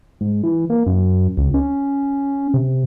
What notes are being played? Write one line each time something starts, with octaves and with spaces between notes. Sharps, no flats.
G#2
E3
A#3
F#2
C#2
C#4
C3